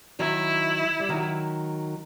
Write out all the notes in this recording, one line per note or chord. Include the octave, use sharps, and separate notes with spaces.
D#3 F#3 E4
G3
D#3 F#3